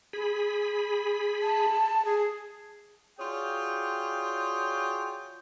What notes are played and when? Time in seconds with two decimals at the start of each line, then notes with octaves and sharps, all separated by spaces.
0.13 G#4 B5
1.41 A5
2.05 G#4
3.20 F4 F#4 G#4 C#5 D5 G5